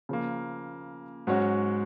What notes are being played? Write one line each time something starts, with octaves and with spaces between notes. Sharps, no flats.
C#3 F3 A#3
G#2 F#3 C#4 F#4